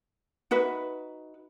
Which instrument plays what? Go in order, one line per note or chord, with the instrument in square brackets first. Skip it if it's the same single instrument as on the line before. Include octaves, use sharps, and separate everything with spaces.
[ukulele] D#4 F#4 B4 E5